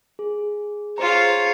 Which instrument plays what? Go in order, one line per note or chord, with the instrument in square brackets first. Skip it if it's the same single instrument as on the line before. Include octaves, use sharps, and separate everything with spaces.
[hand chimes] G#4
[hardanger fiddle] F4 C#5 [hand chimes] G#4 C5 A#5